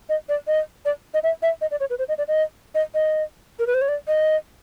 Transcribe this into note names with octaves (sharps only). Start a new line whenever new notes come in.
D#5
D5
D#5
D5
D#5
E5
E5
D#5
D5
C#5
B4
C5
D#5
D5
D#5
D#5
D#5
A#4
B4
C5
C#5
D5
D#5